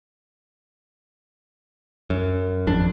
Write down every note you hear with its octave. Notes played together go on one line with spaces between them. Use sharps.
F#2
G#1 F2 D4